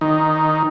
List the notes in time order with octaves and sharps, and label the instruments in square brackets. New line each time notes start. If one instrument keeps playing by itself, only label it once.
[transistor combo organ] D#3